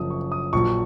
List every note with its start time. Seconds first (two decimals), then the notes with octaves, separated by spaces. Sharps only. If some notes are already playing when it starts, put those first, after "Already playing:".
Already playing: F#1 F#2 F3 D#6
0.10 C#6
0.32 D#6
0.53 A#1 A#2 F#3 C#6